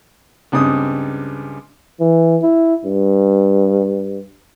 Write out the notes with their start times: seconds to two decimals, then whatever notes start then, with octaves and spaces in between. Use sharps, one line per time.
0.52 C#2 G2 C4 D#6
2.00 E3
2.42 E4
2.85 G2